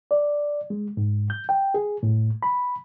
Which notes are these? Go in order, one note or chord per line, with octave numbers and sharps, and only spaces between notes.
D5
G#3
G#2
G6
G5
G#4
A2
B5